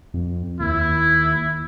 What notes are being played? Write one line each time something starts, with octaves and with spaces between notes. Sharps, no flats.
F2
D#2 E4